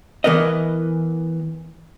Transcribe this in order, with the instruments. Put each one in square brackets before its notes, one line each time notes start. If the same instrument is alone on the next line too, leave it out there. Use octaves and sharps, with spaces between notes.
[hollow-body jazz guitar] E3 B3 A#4 B4 D#5